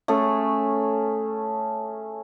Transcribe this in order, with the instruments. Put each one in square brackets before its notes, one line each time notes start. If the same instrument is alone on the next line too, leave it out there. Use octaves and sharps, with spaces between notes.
[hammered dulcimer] A3 C#4 G#4